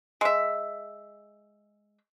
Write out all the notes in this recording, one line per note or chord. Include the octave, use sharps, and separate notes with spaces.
G#3 E5